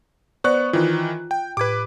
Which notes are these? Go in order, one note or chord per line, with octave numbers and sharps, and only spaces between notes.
B3 C5 D5 C#6 F#6
D#3 E3 F4
G5
A2 B4 D6 G#6